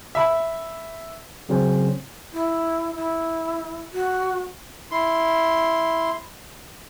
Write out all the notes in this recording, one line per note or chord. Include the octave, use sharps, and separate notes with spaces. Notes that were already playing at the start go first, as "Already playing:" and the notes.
E5 B5
C#3 F#3 C4 C#4 C5
E4
E4
F#4
E4 C6